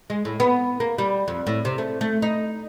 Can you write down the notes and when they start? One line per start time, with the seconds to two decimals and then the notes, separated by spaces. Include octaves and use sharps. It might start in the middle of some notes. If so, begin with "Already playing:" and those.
0.10 G#3
0.25 A2
0.40 B3
0.80 A#3
0.98 G3
1.28 F2
1.47 A2
1.65 C3
1.78 A3
2.01 A3
2.22 D#4